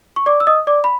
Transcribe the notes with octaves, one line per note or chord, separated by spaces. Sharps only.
C#6
D5 D6
E6
D#5 D#6
D5 D6
B5